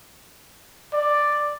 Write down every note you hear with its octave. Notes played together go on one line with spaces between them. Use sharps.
D5